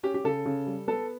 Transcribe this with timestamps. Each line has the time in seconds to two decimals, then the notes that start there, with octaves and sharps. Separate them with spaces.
0.03 C#4 G4
0.14 G4
0.24 C#3 A4
0.45 C#3
0.67 G3
0.88 B3 A4